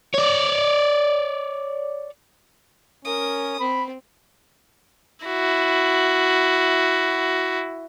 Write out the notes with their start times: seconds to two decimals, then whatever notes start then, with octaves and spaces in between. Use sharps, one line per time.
0.14 C#5 D5
3.05 C#4 A#4 D#6
3.60 C4 B5
5.26 E4 F#4